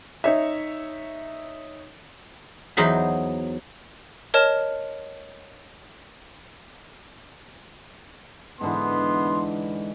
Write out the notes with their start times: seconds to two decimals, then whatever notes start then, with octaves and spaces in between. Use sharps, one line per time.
0.24 D#4 C#5 E5
2.77 E2 F#3 D#4 C5 B5
4.34 A#4 C#5 D#5 A5 F6 E7
8.61 G#2 D3 E3 B3 C6